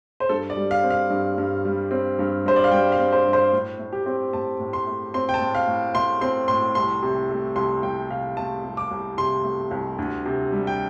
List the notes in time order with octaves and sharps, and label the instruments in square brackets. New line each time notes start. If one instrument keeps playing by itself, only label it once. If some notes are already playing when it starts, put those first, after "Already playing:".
[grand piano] C5
G2 A4
D5
G3
F5
C4
F5
G2
G2
G3
C4
G2
G2 C5
D5
F5
G3 G5
F5
C4
C5
G2
C5
A2
A3
G4
C4
A2 A5
A2
C6
A3
C4 C6
G5
A5
A2
F5
A2
A3 C6
C4 C6
A2 C6
C2 C6
C3
A3
C2 C6
C2 G5
C3 F5
A3 A5
C2
D6
C2
C3 C6
A3
C2
D2
C3
G3
G5